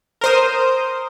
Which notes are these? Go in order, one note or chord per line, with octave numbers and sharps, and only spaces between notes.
A#4 C5 D#6